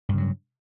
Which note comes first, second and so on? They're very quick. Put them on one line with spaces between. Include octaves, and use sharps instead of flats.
G2 C#3 F#3